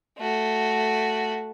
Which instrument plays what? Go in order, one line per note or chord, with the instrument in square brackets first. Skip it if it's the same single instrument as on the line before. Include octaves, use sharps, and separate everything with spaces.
[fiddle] A3 F#4